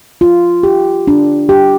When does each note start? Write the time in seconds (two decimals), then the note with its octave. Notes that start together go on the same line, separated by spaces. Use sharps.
0.21 F4
0.63 G4
1.07 D4
1.49 G4